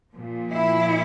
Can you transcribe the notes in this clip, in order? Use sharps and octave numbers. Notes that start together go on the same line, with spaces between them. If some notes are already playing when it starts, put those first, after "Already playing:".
A#2 F3
E4